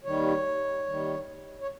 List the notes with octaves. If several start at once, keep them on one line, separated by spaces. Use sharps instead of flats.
D#2 D#3 G3 C#5
D#2 D#3 G3
C#5